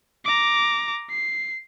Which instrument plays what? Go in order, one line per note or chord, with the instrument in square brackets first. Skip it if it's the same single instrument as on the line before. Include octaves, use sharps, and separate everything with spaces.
[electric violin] A#5 D6
C7